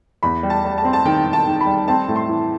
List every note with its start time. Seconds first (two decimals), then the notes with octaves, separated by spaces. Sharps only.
0.23 E2 B5
0.43 G3
0.50 A5
0.65 G3
0.78 A5
0.85 C4
0.93 A5
1.05 D#3 G5
1.26 D#3
1.33 A5
1.46 D#3
1.61 B5
1.67 G3
1.88 C4 A5
2.08 A2
2.16 C6
2.29 E3